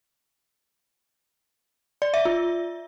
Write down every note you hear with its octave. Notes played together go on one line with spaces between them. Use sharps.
D5
E5
F4